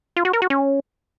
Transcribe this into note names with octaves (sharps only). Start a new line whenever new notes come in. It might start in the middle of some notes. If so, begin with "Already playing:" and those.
F4
F#4
A#4
F#4
C#4